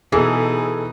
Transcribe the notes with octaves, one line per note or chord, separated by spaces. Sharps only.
B2 E3 D#4 G#4 A4